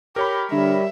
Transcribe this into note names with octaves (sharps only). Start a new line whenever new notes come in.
G4 A#4 C#5 B5
D3 G3 E5